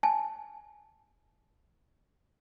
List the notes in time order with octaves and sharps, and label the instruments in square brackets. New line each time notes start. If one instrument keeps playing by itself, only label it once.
[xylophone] G#5 A5